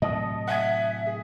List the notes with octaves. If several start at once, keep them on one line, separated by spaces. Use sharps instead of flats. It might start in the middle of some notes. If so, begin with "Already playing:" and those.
A2 C3 F#3 D#5 A5 D#6
E5 F#5 G#5 G#6
G#4